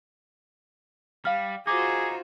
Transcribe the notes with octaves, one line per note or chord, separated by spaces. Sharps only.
G3 F5 F6
D#4 F4 F#4 G#4 C5 D6